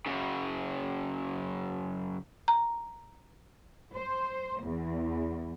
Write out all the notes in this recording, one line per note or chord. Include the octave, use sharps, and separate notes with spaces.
F#2 C#3
A#5
C5
E2